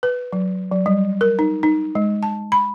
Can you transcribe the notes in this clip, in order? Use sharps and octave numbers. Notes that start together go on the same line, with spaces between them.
B4
F#3
F#3
G3
A#4
D#4
D#4
G#3
A5
B5